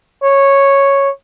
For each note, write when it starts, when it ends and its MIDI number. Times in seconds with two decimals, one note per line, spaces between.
0.23 1.10 73